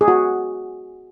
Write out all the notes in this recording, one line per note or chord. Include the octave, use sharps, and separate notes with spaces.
G#4
F#4